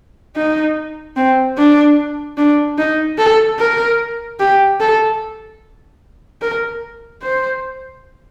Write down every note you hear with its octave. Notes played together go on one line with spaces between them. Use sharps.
D#4
C4
D4
D4
D#4
A4
A#4
G4
A4
A#4
C5